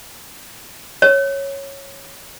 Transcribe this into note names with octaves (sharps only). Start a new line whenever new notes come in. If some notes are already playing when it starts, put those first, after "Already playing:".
C#5